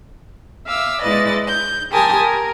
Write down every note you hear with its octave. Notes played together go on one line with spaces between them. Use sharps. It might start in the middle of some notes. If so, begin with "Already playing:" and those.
E5 F5 D6 E6
G#3 E4 B4 D5 D#5 A6
G6
G4 A#4 G#5 A5 C6 D#6
A#4